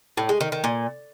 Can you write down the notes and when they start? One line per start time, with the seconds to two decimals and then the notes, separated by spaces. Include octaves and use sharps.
0.17 A2
0.29 G#3
0.41 D#3
0.52 D#3
0.64 A#2